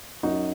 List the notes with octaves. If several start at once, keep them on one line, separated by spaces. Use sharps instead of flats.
F#2 D#4 F#4